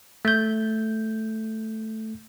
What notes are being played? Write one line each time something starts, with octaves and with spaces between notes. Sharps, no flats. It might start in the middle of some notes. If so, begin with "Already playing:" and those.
A3 G6